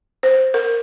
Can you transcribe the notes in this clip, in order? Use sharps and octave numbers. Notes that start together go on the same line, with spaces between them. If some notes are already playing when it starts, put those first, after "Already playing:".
C5
A#4